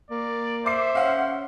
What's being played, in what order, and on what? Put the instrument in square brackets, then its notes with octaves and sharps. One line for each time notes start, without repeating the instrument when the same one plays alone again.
[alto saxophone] A#3 [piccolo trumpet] D5
[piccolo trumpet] C5 [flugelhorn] E5 [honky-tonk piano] D6 C7
[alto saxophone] C#4 [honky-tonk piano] F5 F#5